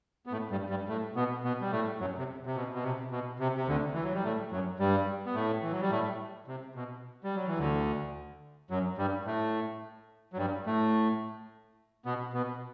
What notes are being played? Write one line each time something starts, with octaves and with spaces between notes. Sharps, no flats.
B3
A2 A3
G2 G3
G2 G3
A2 A3
B2 B3
B2 B3
G3
A2 A3
F#2 F#3
C3
C3
B2
B2
C3
B2
C3
C3
D2 D3
E3
F#3
G3
A2 A3
F#2 F#3
G2 G3
B3
A2 A3
E3
F#3
G3
A2 A3
C3
B2
G3
F#3
E3
D2 D3
F#2 F#3
G2 G3
A2 A3
F#3
G2 G3
A2 A3
B2 B3
B2 B3